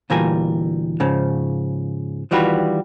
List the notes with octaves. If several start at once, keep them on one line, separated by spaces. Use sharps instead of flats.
D2 A#2 E3 G3 A#4 G#5
G#2 C#3 F3
D#3 E3 G3 F4 F#4 B4